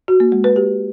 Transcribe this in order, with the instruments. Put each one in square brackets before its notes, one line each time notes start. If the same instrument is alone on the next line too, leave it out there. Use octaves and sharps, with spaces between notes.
[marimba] F#4
A#3
G#3
B4
G4